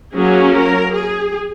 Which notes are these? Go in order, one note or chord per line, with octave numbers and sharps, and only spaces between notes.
F#3 A#3 C#4 G#4
A#4
G#4